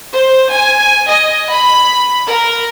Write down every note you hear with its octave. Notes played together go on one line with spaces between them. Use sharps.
C5
G#5
D#5
B5
A#4